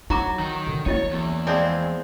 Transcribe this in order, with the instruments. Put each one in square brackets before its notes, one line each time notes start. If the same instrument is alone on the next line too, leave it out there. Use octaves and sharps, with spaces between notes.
[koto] F#3 [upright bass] D#4 [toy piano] E4 A#5 D6
[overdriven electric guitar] D#3
[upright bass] D3
[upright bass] A#3 [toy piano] C#4 E4 D#5 [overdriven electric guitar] C#5
[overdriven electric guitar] E2
[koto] F3 G#3 C4 [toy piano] D5